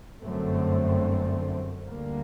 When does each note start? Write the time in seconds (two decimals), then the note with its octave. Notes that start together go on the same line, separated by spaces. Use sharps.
0.23 G1 F#2 D3 A3 C4
1.86 D2 D3 G3 A#3